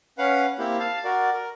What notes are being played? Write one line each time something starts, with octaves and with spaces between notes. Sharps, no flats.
C#4 B4 F5 F#5
A#3 C4 E4 G4
F5 A5
F#4 A#4 D5
A#4